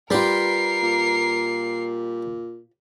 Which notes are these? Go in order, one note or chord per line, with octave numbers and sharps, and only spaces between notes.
G3 F4 G4 A#4 B4 C7
A#2